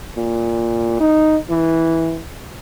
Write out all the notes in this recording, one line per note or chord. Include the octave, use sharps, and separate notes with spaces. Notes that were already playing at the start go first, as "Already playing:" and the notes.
A#2
D#4
E3